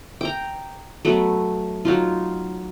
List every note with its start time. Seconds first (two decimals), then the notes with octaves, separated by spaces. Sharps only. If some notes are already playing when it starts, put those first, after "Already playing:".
0.21 G5 A#5
1.05 F#3 A3 B3
1.85 F#3 D#4 F4